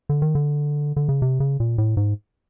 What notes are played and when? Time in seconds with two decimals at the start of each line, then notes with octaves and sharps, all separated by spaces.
0.09 D3
0.22 D#3
0.35 D3
0.96 D3
1.09 C#3
1.22 C3
1.40 C#3
1.60 A#2
1.78 A2
1.97 G#2